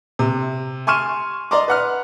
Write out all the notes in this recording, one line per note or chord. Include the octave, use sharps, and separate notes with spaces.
C3
G#5 C6 C#6 F6 D#7 E7
D5 D#5 A#5 C6 D6
B4 F#5 F6